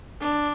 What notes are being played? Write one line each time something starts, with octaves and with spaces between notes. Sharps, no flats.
D4